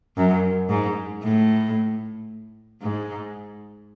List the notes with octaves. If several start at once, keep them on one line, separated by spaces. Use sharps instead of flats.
F#2
G#2
A2
G#2